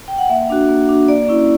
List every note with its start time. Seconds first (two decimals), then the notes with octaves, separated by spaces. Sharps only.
0.08 G5
0.18 F#5
0.29 A#3 E5
0.50 D4 F#4
0.69 A#3
0.89 D4 F#4
1.08 A#3 D5
1.28 C#4 E4